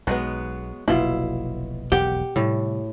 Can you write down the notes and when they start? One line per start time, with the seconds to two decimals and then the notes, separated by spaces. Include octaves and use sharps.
0.07 B1 F#3 G#3 B3
0.88 F1 B1 B2 A#3 E4 F4
1.92 E1 B1 F2 G4 F#5
2.36 A2 C3 G3